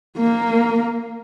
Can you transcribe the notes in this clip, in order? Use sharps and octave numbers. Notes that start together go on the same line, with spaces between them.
A#3